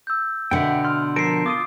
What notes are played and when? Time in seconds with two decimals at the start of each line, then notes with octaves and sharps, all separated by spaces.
0.07 E6 G6
0.51 B2 D3 E5 F#5 G5
0.85 C6 F6
1.16 F3 A4 A#4 C7 D7
1.46 F4 D6 D#6 D#7